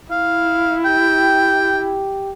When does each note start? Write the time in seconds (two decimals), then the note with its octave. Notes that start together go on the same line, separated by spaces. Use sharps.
0.11 E4 F5
0.85 G4 G5